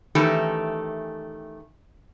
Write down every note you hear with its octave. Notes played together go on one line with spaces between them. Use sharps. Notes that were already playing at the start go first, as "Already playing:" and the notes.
D#3 E3 A3 C#4 G4 A4